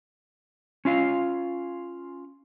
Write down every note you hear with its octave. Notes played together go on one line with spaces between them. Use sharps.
C#4 F4 F5